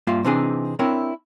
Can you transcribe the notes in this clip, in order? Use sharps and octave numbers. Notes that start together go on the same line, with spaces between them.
G2 A#3 F4 E5 F5
C3 E3 C4 D4 D#4 G#4
C4 D4 E4 A#4 C#5